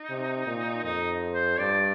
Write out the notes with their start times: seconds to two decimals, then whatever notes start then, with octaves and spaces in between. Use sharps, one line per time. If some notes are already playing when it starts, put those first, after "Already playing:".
Already playing: D#4
0.09 C3
0.46 A#2
0.84 F2 D#4
1.34 C5
1.59 G2 D5